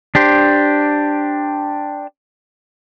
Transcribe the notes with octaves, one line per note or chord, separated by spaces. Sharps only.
D4 G4 C5